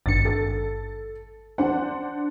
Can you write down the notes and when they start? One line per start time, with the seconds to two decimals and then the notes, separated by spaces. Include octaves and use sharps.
0.06 G#1 G2 A6 C#7
0.25 A4 A6
1.58 D4 C5 F#5